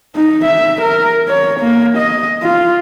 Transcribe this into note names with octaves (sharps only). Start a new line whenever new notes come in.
D#4
E5
A#4
C#5
A#3
D#5
F4